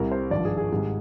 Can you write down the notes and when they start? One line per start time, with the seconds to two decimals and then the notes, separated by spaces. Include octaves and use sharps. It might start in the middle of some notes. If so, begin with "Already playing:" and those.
Already playing: C2 C3 G3 A#4
0.12 C5
0.31 G#1 G2 F3 D5
0.45 G#4
0.58 G#4
0.71 G#1 G#2 G3